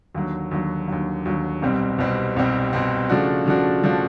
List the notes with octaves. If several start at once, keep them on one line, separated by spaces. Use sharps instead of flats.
D#2 D3 F#3
D#2 D3 F#3
D#2 D3 F#3
D#2 D3 F#3
C2 B2 G3 C4
C2 B2 G3 C4
C2 B2 G3 C4
C2 B2 G3 C4
C#3 F3 A3 D4 F#4
C#3 F3 A3 D4 F#4
C#3 F3 A3 D4 F#4